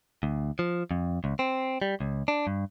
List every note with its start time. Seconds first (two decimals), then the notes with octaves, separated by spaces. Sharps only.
0.23 D2
0.59 F3
0.91 F2
1.24 C#2
1.39 C4
1.82 G3
2.00 C#2
2.28 D4
2.47 G2